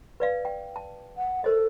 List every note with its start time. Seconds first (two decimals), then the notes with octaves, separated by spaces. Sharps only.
0.20 B4 D5 F5
0.45 G5
0.76 A5
1.17 F#5
1.44 A4 A#4 C5 D#5